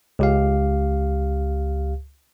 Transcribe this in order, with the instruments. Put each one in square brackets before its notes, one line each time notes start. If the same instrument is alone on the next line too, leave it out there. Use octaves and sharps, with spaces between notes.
[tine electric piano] C#2 G4 F5